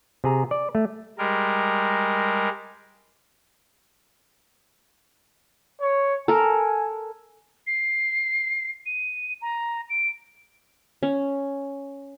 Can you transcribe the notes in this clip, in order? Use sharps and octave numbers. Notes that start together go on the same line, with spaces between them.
C3 G#4 A#5
D5
A3
G3 G#3 A#4
C#5
A4 A#4 G#5
C7
D#7
A#5
D7
C#4